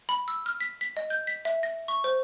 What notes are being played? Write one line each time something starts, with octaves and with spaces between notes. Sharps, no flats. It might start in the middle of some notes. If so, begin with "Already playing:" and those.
B5
E6
F6
B6
B6
D#5
G6
B6
E5
A#6
C#6
C5